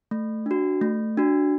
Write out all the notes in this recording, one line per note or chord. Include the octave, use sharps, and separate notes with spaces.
A3
D4 F#4
A3
D4 F#4